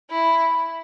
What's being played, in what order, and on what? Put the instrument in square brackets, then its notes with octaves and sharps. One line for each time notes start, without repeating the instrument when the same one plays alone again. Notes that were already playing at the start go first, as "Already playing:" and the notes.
[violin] E4